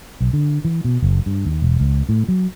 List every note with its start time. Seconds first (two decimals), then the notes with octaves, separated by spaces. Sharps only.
0.21 B1
0.33 D3
0.65 E3
0.85 B2
1.02 F#1
1.26 G2
1.45 D#2
1.62 E1
1.80 C#2
2.09 A2
2.28 F#3